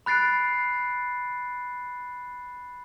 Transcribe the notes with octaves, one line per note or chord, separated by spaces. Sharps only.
B5 F#6 A6 C7 D7